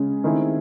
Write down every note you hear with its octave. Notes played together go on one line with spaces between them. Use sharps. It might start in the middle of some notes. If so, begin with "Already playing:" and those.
Already playing: C#3 G#3 C#4
D#3 A3 C4 E4 G#4